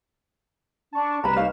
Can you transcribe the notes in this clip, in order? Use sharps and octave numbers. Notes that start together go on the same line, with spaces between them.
D4 A5 C#6
C2 G3 B4 A#5 B5 E7
D#4 C#5 F5